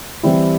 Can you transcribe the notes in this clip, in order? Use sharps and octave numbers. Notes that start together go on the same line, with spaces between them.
E3 G3 C4 E4 G4